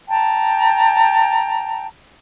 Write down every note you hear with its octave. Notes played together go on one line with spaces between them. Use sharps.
G5 A5 A#5